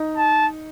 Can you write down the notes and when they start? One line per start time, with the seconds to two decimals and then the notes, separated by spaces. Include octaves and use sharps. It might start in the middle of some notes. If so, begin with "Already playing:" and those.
Already playing: D#4
0.17 A5